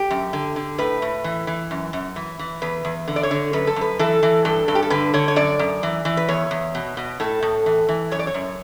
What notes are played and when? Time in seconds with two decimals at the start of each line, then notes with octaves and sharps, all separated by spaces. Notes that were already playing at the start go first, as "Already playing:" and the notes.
Already playing: G4
0.11 F#2
0.33 D3
0.56 D3
0.78 A2 B4
1.02 A2
1.24 E3
1.47 E3
1.71 F#2
1.93 F#2
2.16 E3
2.39 E3
2.62 E2 B4
2.85 E2
3.08 D3
3.16 D5
3.23 C#5
3.31 D3
3.53 F#2 B4
3.67 A4
3.76 F#2 B4
3.99 E3 A4
4.23 E3
4.45 G2 A4
4.68 G2 A4
4.75 G4
4.83 A4
4.90 D3 B4
5.14 D3 C#5
5.28 C#5
5.36 F#2 D5
5.59 F#2
5.83 E3
6.05 E3
6.17 B4
6.29 E2 C#5
6.51 E2
6.75 B2
6.97 B2
7.20 A2 A4
7.43 A2
7.66 E3
7.89 E3
8.11 F#2 C#5
8.19 D5
8.27 C#5
8.34 F#2